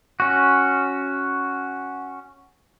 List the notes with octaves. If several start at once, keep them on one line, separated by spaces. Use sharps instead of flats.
C#4 F#4